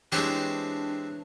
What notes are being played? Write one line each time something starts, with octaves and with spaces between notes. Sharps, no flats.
E3 G#3 C4 D4 G4 C#5